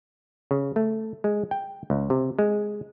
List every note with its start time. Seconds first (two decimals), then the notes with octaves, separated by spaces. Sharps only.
0.51 C#3
0.76 A3
1.24 G#3
1.51 G5
1.90 C#2
2.10 C3
2.39 G#3